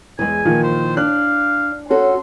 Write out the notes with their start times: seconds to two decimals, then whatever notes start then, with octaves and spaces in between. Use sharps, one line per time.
0.19 E2 E3 G#3 G#5
0.45 A#2 D#3 F3
0.63 C5
0.97 D4 F5 F#6
1.90 C#4 F#4 A4 C6